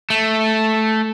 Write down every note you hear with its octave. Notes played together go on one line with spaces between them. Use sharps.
A3